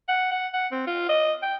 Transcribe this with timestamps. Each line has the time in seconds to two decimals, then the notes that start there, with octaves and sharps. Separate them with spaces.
0.08 F#5
0.31 F#5
0.54 F#5
0.72 C4
0.87 F4
1.09 D#5
1.42 G5